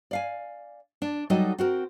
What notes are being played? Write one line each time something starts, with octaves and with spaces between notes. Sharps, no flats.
D5 F5 G#5
D4
F#3 G3 D#4 F#4 A4 D#5
C4 F#4 A#4